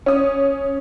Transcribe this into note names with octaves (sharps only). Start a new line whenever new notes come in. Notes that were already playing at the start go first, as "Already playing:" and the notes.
C#4 D#6